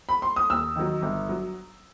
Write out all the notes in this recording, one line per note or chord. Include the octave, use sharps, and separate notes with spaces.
B5
C6
D#6
D#2 E6
D#3 F#3
G1
F#3